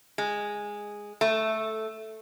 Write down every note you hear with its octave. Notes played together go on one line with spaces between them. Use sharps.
G#3
A3